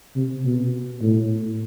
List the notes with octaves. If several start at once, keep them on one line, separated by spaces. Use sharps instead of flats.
C3
B2
A2